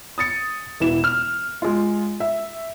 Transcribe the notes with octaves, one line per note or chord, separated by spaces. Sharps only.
D#6 A6 C#7
E1 E3 E7
F6
G#3 F4
E5